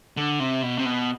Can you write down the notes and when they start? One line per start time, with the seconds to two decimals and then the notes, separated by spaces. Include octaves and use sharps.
0.17 D3
0.40 C3
0.63 B2
0.78 C3
0.85 B2